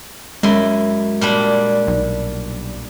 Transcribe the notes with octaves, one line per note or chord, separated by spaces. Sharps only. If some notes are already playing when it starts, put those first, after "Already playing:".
F#2 G#3 E4 C6
A#2 G3 D4
B1